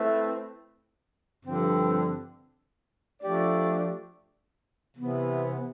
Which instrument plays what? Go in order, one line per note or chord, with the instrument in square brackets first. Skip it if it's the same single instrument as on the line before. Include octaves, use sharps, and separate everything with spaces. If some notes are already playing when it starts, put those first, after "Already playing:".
Already playing: [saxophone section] A3 C4 E4 B4 E5
G2 D3 F3 C4
F3 A3 D4 G4 D5
C3 E3 B3